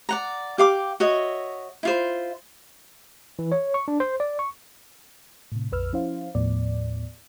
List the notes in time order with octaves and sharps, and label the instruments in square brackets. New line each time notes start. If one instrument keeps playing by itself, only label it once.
[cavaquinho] D5 F#5 A#5
G4 F5 D6
F#4 C#5 D#5 E5
E4 F4 C5
[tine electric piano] E3
C#5
C#6
D4
C5
D5
C#6
[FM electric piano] A2 C3
A#1 F2 B4 E6 F6
F3 C#4 E4 C5 F5
D#2 A2 F3 B3 D5